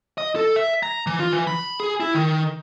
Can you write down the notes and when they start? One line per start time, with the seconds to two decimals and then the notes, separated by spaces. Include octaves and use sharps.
0.18 D#5
0.36 A4
0.56 E5
0.83 A#5
1.07 E3
1.20 F4
1.33 E3
1.47 B5
1.80 G#4
2.00 E4
2.15 D#3